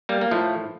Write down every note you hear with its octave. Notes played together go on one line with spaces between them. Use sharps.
G3 A#3
A#3
A2 F3 A3